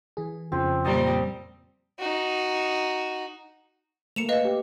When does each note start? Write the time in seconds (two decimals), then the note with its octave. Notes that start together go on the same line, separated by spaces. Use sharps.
0.17 E3 G#4
0.52 F2 C#3 F3 C4
0.84 A#2 G3 C4 D#5 A5 A#5
1.99 D#4 F#4
4.16 A3 A#3 C#7 E7 F7
4.29 B4 D#5 F5
4.45 G4